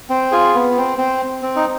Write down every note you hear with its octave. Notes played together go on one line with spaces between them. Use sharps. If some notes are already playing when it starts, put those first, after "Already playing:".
C4
F4 G#4
B3
C4
C4
C4
D#4